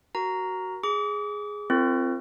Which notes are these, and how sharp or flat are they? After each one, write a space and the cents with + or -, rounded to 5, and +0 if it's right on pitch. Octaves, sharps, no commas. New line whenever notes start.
F#4 +15 A#4 +20 A#5 +0
G#4 +0 D6 -35
C4 +0 F4 -30 A#4 -45